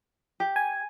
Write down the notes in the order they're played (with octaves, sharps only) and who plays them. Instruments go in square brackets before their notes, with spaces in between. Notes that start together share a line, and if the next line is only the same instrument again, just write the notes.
[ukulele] G4
[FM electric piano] G#5